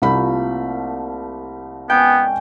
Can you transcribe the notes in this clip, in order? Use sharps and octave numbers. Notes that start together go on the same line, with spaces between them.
C2 F3 A3 A#3 B5
G#2 B3 C#4 D5 G5